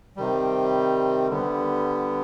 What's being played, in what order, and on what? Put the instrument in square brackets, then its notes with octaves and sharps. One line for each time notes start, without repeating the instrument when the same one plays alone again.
[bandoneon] C3 D#3 G3
D3 G3 B3